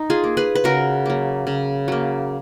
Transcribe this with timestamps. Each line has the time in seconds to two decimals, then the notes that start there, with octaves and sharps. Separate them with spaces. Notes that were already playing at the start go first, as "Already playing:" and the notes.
Already playing: D#4
0.10 F4 G#4
0.24 A#3
0.37 G#4 B4
0.55 B4
0.64 C#3 F#4 A#4
1.06 F#3 A#3
1.47 C#3
1.88 F#3 A#3